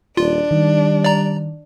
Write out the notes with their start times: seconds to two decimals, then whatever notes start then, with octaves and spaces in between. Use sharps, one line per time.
0.17 D#1 D4 F4
0.51 D#3 G3
1.04 D5 A#5